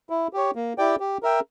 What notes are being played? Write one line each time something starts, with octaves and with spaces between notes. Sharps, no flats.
E4
G4 C#5
A#3
E4 G4 D5 G5
G4
A#4 E5 G5